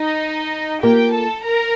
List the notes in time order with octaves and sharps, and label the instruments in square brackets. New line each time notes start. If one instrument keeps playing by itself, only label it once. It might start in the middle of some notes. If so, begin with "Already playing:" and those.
Already playing: [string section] D#4 D#5
[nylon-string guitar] A#3 F4 A#4 [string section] G4 G5
[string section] A4 A5
A#4 A#5